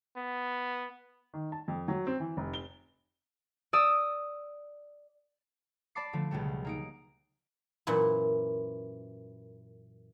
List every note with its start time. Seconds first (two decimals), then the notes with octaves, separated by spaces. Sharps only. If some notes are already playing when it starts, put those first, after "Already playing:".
0.16 B3
1.34 D#3
1.52 A5
1.68 F2
1.88 F#3
2.07 C4
2.20 E3
2.37 F1
2.54 G7
3.73 D5 D#6 E6
5.95 D5 A5 B5 D6 C7
6.13 D3 F3 A3
6.31 C#2 B2 F#3 G3 A3
6.65 A#3 D#4 D7
7.87 F#2 A#2 E3 E4